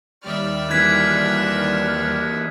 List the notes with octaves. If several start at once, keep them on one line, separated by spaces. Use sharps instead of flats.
D#2 G3 D5 E5 F6
E3 A#3 F#6 G#6 B6